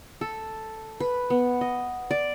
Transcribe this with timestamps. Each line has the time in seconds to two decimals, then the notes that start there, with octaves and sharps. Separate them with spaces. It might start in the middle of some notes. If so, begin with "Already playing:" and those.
0.21 A4
1.00 B4
1.30 B3
1.61 D#5
2.11 D5